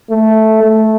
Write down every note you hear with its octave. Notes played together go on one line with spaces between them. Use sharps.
A3
A3